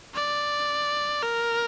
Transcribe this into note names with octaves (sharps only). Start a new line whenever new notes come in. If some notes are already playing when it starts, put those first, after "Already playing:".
D5
A#4